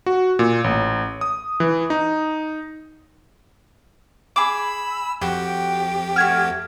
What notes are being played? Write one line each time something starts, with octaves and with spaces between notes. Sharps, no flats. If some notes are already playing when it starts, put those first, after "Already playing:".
F#4
A#2
A1
D#6
E3
D#4
G#4 B5 D6 E6
F2 F#4 G4 G5 G6
A3 F#4 F6 G#6